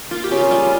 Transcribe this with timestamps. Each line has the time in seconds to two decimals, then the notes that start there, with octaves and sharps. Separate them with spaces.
0.11 A#3 F4
0.24 G4
0.31 C#3
0.37 F4
0.51 G3 F4